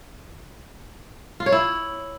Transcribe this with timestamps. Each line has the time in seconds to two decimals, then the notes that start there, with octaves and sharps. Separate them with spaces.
1.40 F4
1.46 C#5
1.52 E4